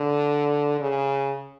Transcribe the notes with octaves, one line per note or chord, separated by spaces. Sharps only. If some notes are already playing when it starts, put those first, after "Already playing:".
Already playing: D3
C#3